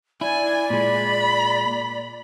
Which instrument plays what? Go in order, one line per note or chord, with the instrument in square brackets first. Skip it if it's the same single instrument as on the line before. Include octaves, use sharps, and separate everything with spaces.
[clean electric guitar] E4 [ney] D5 [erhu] G#5
[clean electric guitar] A#2 G#3 [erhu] B5